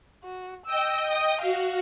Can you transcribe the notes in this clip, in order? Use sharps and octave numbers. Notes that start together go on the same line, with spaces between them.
F#4
D#5 G5 E6
D#6
F#4 F5